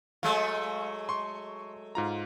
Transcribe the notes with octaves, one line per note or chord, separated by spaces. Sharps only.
F#3 G#3 A3 F5
C6 C#6
G#2 F4 A#5